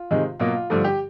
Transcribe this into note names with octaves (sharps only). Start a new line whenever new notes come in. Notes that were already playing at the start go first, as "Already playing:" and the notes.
Already playing: F4
C3 D#3 G#3
B2 F#3 A#3 F4
G2 D3 F3 A3
G4